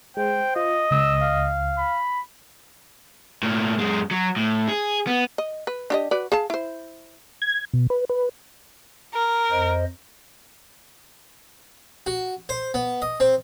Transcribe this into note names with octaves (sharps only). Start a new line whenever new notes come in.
G#3 C5 G5
F4 D#5
C#2 E6
F5
B5
A2 A#3
F#2 G#3
F#3
A2
G#4
B3
D#5
B4
D4 G4 D#5
F#4 B4 D5
G#4 F5 A5
E4 C5
G#6
B2
B4
B4
A#4
F2 C5 D#5
F#4
C5
B3
D#5
C4